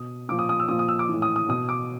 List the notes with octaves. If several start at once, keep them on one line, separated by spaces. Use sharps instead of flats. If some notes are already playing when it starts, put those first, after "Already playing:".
Already playing: B2 D#6
A#2 F3 D6
D#6
D#6
E6
A#2 F3 D#6
D#6
E6
D6
A2 E3
D#6
D#6
B2 D#6
D6